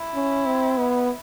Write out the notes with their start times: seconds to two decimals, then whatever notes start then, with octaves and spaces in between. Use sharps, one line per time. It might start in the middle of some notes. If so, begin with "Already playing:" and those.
Already playing: E4
0.15 C#4
0.46 C4
0.78 B3